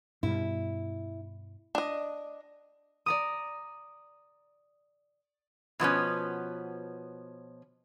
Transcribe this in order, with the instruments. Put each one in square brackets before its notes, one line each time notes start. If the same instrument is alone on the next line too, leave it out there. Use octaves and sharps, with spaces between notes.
[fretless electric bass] G2 B2 [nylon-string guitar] E4
[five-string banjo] D4 D#5
[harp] D5 A#5 D#6
[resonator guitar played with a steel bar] B2 F3 B3 C#4